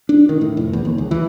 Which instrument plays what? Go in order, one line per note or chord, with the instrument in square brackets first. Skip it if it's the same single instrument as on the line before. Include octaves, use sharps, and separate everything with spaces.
[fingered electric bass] D4
D#3
A2
F1
E2
D#2
C#2
E3